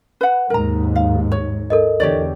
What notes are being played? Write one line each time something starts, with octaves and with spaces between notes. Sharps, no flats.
B4 F#5
D#2 G#2 A#4 A#5
F5
C#5
A4 A#4 D#5
E2 D3 G4 C#5 D5